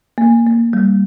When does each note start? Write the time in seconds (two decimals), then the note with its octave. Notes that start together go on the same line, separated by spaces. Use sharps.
0.18 A#3
0.46 A#3
0.73 G3